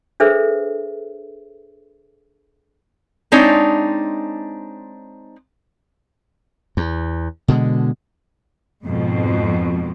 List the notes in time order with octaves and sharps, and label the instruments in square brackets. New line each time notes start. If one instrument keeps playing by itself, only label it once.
[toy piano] D4 G#4 A4 B4 C5 E5
[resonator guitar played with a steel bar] G#3 C4 D4 D#4 C#5
[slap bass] E2
B2 D3 G#3
[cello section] F2 G#2 B2